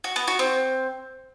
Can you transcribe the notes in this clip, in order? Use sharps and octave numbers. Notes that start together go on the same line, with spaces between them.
F#4
B3
F#4
C4